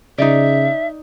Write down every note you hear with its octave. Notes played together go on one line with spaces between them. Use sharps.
C#3 D#4 D5 E5